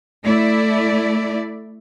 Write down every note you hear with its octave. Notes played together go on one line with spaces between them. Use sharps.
A3 E4 D5